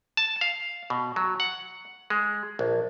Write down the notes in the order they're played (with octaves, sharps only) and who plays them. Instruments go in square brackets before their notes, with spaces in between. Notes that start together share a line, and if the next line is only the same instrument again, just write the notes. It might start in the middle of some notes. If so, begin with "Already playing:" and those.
[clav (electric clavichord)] A5
F5
B2
F#3
F#5
G#3
A#1